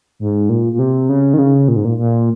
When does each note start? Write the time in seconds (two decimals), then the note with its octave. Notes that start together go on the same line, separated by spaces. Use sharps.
0.19 G#2
0.49 A#2
0.73 A#2
0.79 C3
1.09 C#3
1.34 D#3
1.38 C#3
1.68 A#2
1.76 G#2
1.85 A#2
1.98 A#2